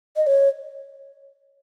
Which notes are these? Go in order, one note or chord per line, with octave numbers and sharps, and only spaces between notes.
D#5
C#5